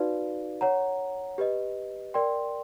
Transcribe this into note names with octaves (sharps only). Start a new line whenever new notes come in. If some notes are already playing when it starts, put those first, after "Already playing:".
Already playing: D#4 F#4 B4 D5 F5
C#5 F#5 A#5
G4 B4 D#5
A#4 D5 G5 C6